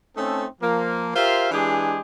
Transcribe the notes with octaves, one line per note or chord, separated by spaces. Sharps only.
A3 C4 C#4 D#4 A4
F3 A#3
F4 G4 A#4 C5 E5 F5
E3 G#3 D4 G4 G#4